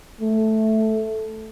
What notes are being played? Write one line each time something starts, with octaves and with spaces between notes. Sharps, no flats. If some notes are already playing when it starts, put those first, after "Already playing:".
A3